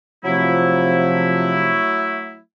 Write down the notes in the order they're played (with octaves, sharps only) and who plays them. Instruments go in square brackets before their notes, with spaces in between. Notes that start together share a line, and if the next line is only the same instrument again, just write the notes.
[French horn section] C3 F3 [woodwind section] F#3 A3 E4